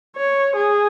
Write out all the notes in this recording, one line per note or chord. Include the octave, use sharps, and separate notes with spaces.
C#5
G#4